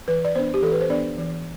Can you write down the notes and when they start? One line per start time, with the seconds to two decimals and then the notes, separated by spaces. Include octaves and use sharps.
0.08 E3 B4
0.25 D5
0.35 B3 D4 C5
0.54 G4
0.62 E3 A4
0.72 B4
0.81 C5
0.89 B3 D4 D5
1.18 E3